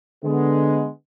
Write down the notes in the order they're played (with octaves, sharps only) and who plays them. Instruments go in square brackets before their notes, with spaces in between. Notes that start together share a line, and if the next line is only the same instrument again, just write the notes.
[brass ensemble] D3 G#3 B3